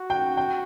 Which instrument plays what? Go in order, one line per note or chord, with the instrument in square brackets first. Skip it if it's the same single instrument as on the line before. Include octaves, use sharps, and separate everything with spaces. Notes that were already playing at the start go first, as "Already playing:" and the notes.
Already playing: [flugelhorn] F#4
[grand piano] G5
G5